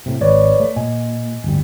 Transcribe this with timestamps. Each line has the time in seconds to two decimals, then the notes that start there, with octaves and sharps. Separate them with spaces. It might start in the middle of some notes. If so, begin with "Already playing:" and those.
0.06 A2 C3
0.21 G#1 B4 C#5 D5
0.60 A3
0.76 A#2 D#5 G#5
1.44 D1 G1 G3